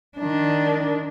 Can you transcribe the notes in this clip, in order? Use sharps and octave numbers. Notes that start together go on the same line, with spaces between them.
D#3 D4